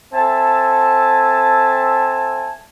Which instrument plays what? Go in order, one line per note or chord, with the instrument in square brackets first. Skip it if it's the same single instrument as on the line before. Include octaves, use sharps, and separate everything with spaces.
[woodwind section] C4 A4 E5 G#5 A5